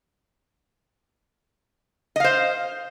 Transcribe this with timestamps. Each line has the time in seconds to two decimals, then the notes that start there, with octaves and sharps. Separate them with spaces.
2.16 D#5
2.20 F5
2.24 C5